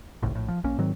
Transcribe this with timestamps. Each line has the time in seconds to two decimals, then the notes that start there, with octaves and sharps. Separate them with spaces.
0.23 G#1 C#2 A2
0.35 A#1 A2
0.48 F3
0.64 A#1 A#3 C#4
0.78 G#2 D#3 F#3 C4